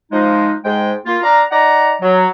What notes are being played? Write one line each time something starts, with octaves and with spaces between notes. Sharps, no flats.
F3 G#3 D#4
G#2 G#3 G5
A#3 F4
D4 D5 F5 A#5
D#4 D5 F#5 A#5
F#3